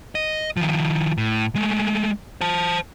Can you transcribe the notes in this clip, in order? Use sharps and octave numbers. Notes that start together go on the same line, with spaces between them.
D#5
D#3 F3
A2
G#3 A3
C5 A5